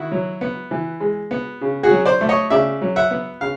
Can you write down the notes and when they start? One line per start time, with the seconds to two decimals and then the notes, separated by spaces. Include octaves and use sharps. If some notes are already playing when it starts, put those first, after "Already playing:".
Already playing: D#3 E4 F#4
0.12 F#3
0.41 B3
0.71 E3
1.00 G#3
1.31 B3
1.61 C#3
1.83 F#4 G#4
1.91 F#3
2.06 C5 D5
2.21 A3
2.29 C#5 D#5
2.50 C#3 D5 E5
2.82 F#3
2.96 E5 F#5
3.11 B3
3.41 C#3 F5